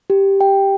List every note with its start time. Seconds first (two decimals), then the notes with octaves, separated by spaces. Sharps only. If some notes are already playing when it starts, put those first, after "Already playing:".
0.10 G4
0.41 G5